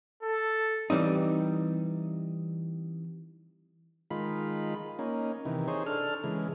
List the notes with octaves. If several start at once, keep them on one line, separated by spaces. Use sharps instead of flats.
A4
E3 G3 C4 D#4
D#3 G#3 F4 B5
A#3 C#4 D#4
C3 D#3 E3
D#4 G#4 C5 C#5
D4 A4 F6
C#3 E3 G#3